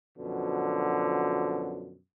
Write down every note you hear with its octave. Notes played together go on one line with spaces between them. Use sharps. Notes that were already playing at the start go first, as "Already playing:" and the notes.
F#2 B2 D3 F3